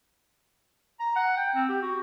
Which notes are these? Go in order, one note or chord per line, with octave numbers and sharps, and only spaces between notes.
A#5
F#5
G5
C4
G4
F#4